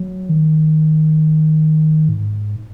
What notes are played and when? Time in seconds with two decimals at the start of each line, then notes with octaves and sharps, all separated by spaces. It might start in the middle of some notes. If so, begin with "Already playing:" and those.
Already playing: F#3
0.29 D#3
2.09 G#2